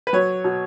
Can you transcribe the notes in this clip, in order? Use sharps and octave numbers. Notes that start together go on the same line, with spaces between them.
B4
F#3 C#5
B2